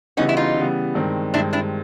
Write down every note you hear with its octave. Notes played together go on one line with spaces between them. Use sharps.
C#3 E3 G3 B3 C#4 D#4
E4
D#4 F4
C#3 E3 G3 B3
G2 D#3 G#3 C4
G2 D#3 G#3 C4 D4 E4
D4 E4